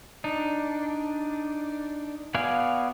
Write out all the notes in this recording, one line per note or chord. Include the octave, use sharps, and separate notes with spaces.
D4 D#4
B3 F#4 D5 F5 G#5